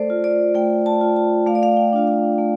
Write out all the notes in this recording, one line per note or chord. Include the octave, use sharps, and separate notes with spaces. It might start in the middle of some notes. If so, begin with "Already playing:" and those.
Already playing: A3 A4 C5 D5
F4
D5
A3 G5
A5
F4
A5
A3 F5
D5
F5
G5
D4 F4
F5
A3